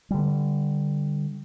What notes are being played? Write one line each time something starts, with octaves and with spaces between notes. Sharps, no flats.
D3 G3